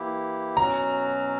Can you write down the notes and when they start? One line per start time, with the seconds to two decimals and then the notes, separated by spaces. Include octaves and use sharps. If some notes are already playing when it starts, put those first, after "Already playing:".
Already playing: E3 A#3 E4 G4
0.56 B2 F#3 C#4 F#4 A#5